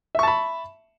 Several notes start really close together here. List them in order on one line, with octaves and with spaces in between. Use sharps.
E5 C#6 A5 B5